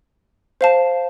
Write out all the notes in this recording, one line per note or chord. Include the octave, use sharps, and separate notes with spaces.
C5 F5 A5